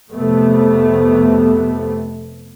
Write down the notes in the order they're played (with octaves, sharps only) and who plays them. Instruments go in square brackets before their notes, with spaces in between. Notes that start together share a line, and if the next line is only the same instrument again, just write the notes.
[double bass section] F2 C3 A3 B3